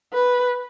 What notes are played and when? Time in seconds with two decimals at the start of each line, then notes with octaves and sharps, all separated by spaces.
0.13 B4